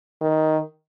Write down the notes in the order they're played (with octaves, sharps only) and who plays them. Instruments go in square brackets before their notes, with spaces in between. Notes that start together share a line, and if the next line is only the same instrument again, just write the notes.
[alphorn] D#3